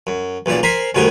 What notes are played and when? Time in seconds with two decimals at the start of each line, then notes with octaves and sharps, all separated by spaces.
0.07 F#2
0.46 B1 A#2 C#3 D5
0.63 A#4 C5 G#5 A#5 B5
0.95 C2 F#2 A2 D#3 F#4 G#5